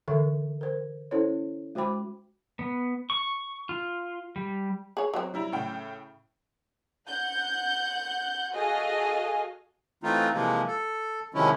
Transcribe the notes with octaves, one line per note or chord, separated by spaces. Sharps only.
D3 E3 A4 A#4 E5 C#6
A#4 C5
C#4 E4 A4 C5 C#5
G#3 F#4 C5 G5 B5 D6
B3
C#6
F4
G3
G#4 C#5
F#3 C4
G3 E4 A#5
A2 C#3 G5
F#5 G6
F#4 G#4 A4 D#5 F5 G#5
E3 A3 C4 D#4 F4
C3 E3 F3 G#3 A#3
A4
C3 D#3 F3 G#3 C#4 E4